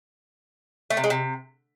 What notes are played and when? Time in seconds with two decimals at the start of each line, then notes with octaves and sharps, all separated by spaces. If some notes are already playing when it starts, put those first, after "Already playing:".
0.90 A3
0.97 C3
1.04 G#3
1.10 C3